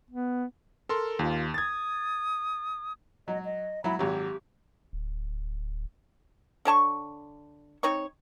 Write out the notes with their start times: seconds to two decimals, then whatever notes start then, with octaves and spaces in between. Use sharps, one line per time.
0.11 B3
0.89 A4 A#4 C6
1.19 D#2 F4
1.54 D#6 G#6 A6
3.28 F#3 D#5
3.45 D#5
3.84 F#3 E4 B5
3.99 G#1 F#3 G4
4.93 D1
6.65 D3 C#5 A5 C#6
7.83 C4 D#4 C#5 C#6